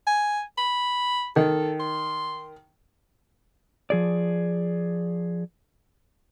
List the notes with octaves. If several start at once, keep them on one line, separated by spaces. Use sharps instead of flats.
G#5
B5
D#3 A4
C6
F3 G#4 D5